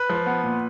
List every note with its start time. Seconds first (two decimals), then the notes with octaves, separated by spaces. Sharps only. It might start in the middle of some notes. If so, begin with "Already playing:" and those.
Already playing: B4
0.10 F3
0.26 B3
0.43 A#2